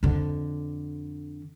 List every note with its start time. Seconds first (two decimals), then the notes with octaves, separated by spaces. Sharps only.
0.03 F2 D3